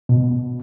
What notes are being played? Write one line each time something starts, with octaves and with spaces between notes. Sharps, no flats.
B2